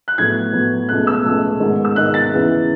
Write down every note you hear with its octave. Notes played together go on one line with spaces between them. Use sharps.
F#6
A2 F#3 B3 G#6
A2 F#3 B3
C#2 B2 A3 F#6
E6
C#2 B2 A3
G#2 D#3 G#3 B3
E6
G#2 D#3 G#3 B3 F#6
A6
E2 C#3 E3 B3